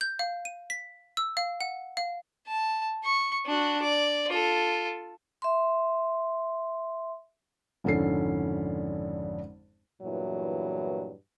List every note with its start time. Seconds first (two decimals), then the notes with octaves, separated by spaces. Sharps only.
0.01 G6
0.19 F5
0.45 D#7
0.70 B6
1.17 E6
1.37 F5
1.61 F#5
1.97 F5
2.48 A5
3.05 C#6
3.46 D4 F#4
3.82 D5
4.28 F4 A4
5.42 E5 C6
7.84 G#1 F2 D3 C#4 A4 C7
10.02 E2 G2 A#2 E3 F#3